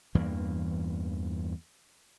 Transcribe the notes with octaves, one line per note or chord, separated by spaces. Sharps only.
E2 G2 E3 A#3